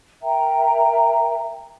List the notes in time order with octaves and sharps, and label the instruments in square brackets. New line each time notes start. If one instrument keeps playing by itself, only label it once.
[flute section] A#4 E5 G5 A#5